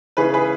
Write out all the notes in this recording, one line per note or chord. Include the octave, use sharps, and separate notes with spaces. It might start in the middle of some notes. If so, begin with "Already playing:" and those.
C#3 E3 G#4 B4
G#4 B4